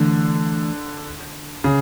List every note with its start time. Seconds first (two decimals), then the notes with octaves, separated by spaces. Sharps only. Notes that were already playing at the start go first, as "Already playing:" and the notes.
Already playing: D3 E3 A3 D4
1.64 C#3